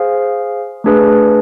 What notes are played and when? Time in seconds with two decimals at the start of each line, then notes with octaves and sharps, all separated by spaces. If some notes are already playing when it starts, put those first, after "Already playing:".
Already playing: G#4 C5 F5
0.84 A3 D4 G#4 B4